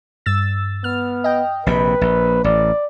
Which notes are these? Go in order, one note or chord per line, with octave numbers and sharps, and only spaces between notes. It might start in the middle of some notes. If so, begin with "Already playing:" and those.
G2 E6 A6
B3 F6
D#5 G5
A#1 C3 B4 B5
A#1
A1 D5